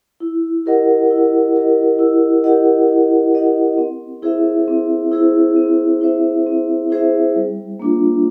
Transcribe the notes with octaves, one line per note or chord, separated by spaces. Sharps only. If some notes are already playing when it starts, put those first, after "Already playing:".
E4
G4 A#4 D#5 F#5
E4
G4 A#4 D#5 F#5
E4
G4 A#4 D#5 F#5
E4
G4 A#4 D#5 F#5
C4
E4 G#4 C5 E5
C4
E4 G#4 C5 E5
C4
E4 G#4 C5 E5
C4
E4 G#4 C5 E5
G3
A#3 D4 F4